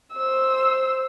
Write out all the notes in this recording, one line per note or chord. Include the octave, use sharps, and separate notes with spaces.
C5 E6